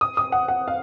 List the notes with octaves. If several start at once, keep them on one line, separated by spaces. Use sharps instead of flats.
D#6
D#6
F#5
F#5
F5